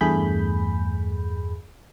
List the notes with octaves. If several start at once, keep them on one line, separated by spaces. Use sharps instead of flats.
E2 G2 A3 G#4 B5 G6